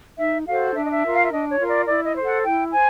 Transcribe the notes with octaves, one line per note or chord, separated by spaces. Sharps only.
D#4 E5
F#4 A4 C5 F5
D4 E5
D#5
E5
F4 A#4
F5
E5
D4 D#5
C#5
F4 A#4
D5
E4 D5
D#5
A4 C5
F#5
E4 G5
C5 G#5